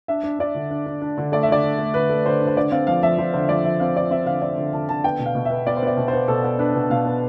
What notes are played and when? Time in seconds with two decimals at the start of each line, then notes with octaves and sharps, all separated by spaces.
0.08 D4 E5
0.24 D4
0.39 D4 D5
0.55 D3
0.71 D4
0.86 D4
1.02 D4
1.18 D3
1.32 A3 D5
1.43 E5
1.49 D3 D5
1.63 D4
1.78 A3
1.94 D3 B4
2.09 A3
2.25 D3 C5
2.41 D4
2.47 C5
2.57 D3 D5
2.72 C4 F5
2.87 F3 F5
3.03 F3 E5
3.18 F3 C5
3.34 D3 C5
3.49 F3 D5
3.64 F3 E5
3.80 C4 F5
3.96 C4 D5
4.11 C4 E5
4.26 D3 F5
4.42 C4 D5
4.58 D3
4.73 D3 A5
4.89 D3 A5
5.04 B3 G5
5.19 B2
5.26 F5
5.35 B2
5.45 B3 E5
5.67 B3 D5
5.77 C5
5.82 B3 D5
5.97 B2
6.08 C5
6.13 B3
6.28 B2 A4
6.44 B3
6.59 D4 B4
6.75 B2
6.90 B2 F5
7.06 B3